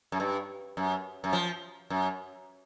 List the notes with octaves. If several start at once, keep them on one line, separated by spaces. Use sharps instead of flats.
F#2
G2
F#2
F#2
F3
F#2